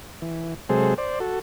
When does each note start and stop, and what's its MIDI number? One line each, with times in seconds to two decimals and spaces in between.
0.22 0.54 52
0.69 0.94 48
0.69 0.94 54
0.69 0.94 56
0.69 0.94 68
0.69 0.94 69
0.69 0.94 72
0.98 1.19 72
0.98 1.19 74
1.20 1.39 66
1.20 1.39 69